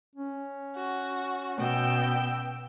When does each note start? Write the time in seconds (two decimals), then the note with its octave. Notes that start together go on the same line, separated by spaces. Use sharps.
0.16 C#4
0.76 F#4
1.58 B2 G5 E6